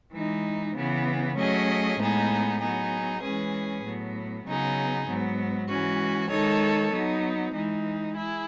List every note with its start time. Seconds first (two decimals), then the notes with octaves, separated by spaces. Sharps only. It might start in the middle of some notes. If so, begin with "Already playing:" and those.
0.12 E3 G#3 D#4
0.74 C#3 E3 B3
1.36 F#3 A3 C#4 G#4 D#5
1.97 A2 G#3 B3 D#4 G#4
2.59 F#3 B3 D#4 G#4
3.21 E3 G#3 C#4 G#4 B4
3.83 A2 F#3 B3
4.44 C#3 F#3 B3 D#4 G#4
5.06 G#2 F#3 B3
5.68 E3 G#3 C#4 F#4
6.29 D#3 G#3 D#4 A4 C#5
6.91 F#3 B3 D#4
7.53 E3 G#3 D#4
8.14 E4 G#4